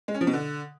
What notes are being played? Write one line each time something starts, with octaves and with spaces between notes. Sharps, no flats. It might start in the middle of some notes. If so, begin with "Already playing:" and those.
G#3
C#4
F3
B2
D3